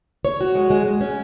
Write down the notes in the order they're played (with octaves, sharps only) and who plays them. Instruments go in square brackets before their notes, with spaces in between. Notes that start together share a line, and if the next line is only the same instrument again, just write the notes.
[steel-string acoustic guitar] C#5
F#4
G#3
G#3
G#3
C#4